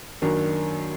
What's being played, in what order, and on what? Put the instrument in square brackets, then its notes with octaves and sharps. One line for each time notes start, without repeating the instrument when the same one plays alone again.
[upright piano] F#2 D#3 A#3 D4